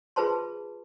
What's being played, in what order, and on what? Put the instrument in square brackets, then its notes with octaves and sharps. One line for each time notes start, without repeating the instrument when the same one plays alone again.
[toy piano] F4 G#4 B4 C5 A5 C6